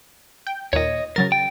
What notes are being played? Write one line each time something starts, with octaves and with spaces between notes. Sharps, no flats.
G5
D#2 A#2 C#5 D#5
C#3 F#3 A#4 A6
G5